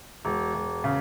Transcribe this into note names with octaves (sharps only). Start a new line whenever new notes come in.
E1
E1
C#3